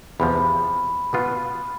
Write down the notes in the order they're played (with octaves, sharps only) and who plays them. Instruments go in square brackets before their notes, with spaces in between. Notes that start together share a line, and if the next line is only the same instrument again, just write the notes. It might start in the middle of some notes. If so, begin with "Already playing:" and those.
[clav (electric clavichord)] E2 C3 F3 [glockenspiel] B5
[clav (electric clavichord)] B2 B3 F4